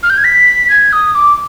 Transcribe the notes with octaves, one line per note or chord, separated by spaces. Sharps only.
F6
G6
G#6
B6
G#6
D#6
D6